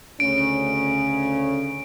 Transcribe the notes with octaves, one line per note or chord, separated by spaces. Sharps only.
D2 C#3 C#4 D7